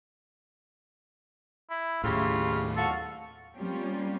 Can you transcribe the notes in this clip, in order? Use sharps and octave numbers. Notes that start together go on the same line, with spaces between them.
E4
D#2 A2 C#3 E4 F4 G4
F#4 A4 F5
G3 A#3 C4 C#4 F4 G4